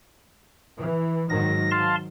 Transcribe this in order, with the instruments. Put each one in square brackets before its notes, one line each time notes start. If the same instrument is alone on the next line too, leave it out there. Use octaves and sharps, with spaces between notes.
[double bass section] E3
[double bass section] G#2 D#3 F#3 [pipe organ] A#6
[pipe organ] F5 A5 C6